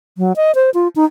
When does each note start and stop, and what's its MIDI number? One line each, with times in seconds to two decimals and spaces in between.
0.18 0.33 54
0.36 0.54 75
0.55 0.70 72
0.74 0.88 65
0.96 1.05 63